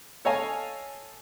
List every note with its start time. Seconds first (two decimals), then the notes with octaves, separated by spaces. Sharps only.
0.25 A4 C#5 D#5 F5 G#5 A5